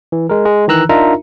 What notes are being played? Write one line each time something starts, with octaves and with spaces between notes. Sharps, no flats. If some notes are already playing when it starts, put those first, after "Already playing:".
E3
G#3 A#4
G#3
D#3 E3 A#5 E6 F#6
D4 D#4 F4 A#4 E5 A#5